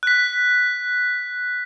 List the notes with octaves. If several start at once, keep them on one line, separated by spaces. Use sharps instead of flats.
F#6 B6